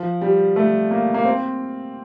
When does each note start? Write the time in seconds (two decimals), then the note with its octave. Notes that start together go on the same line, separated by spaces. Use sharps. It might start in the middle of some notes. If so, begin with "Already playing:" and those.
Already playing: F3
0.21 G3
0.56 A3
0.91 A#3
1.14 A#3
1.25 C4